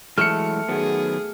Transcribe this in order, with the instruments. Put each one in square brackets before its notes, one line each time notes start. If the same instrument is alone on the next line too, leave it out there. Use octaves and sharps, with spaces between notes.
[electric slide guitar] E3 F#3 G#3 [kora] A3 [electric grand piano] F6 C#7
[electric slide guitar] D#3 F#3 B3 [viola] G#4